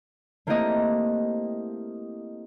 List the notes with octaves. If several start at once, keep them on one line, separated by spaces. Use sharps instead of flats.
A3 A#3 C4 E4 G4 D#5